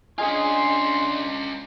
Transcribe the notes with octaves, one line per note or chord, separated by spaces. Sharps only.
C#4 D4 F4 G#4 D#5 G#5 C6